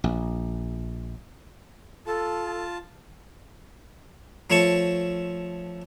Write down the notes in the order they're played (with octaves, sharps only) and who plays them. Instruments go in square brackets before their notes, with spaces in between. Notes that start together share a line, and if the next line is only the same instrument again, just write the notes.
[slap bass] A#1
[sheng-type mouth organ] F4 A5 [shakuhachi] A4
[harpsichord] F3 A3 C#5 A5 C#6